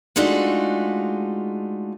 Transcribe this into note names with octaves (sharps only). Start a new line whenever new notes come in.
G#3 A3 D4 D#4 F4 F#4